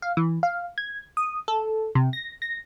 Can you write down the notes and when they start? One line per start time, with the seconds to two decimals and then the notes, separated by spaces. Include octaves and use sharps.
0.02 F5
0.17 E3
0.43 F5
0.78 G#6
1.17 D#6
1.48 A4
1.95 C3
2.13 A#6
2.42 A#6